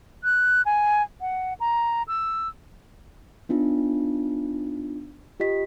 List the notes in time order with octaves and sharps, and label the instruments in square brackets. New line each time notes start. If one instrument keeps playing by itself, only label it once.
[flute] F#6
G#5
F#5
A#5
E6
[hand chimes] B3 D4 D#4 F4
F4 G4 D#5 B6